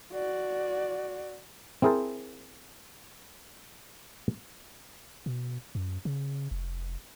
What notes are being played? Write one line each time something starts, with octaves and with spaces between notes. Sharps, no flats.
F#4 D5
C4 E4 G#4 A#4 C5 A5
B2
F#2
C#3
F1